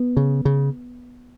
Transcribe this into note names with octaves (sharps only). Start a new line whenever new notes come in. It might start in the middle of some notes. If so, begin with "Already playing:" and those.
Already playing: B3
C#3
C#3